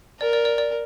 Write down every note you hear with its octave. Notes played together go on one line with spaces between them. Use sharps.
A#4 D5
D5
D5
D5